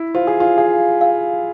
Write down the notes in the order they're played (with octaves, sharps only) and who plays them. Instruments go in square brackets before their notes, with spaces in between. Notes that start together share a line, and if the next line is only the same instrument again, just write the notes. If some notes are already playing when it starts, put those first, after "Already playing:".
Already playing: [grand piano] E4
[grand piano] F4 [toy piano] C5
[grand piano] G#4
F4
[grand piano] G#4 [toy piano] F5
[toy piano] F5